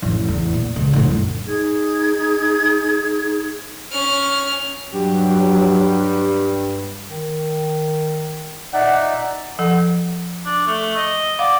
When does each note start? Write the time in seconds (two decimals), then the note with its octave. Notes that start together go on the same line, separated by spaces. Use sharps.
0.02 A1 F2
0.29 E2
0.54 A#2
0.76 C#2
0.93 A#1 A2
1.08 F#2
1.46 D#4 G#4 G#6
3.91 C#4 F6
4.94 G2 F#3 G4
7.09 D#3
8.73 A#2 D#4 D5 E5 F#5
9.59 F3 A4 F#5
10.45 D4
10.67 A3
10.96 D#5
11.39 D5 F5 F#5